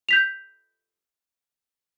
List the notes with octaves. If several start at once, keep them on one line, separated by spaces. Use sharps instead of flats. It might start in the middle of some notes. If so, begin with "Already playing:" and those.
G6 B6 F7